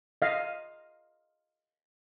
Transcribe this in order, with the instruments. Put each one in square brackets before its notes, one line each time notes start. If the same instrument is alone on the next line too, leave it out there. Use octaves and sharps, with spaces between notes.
[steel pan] D#5 F5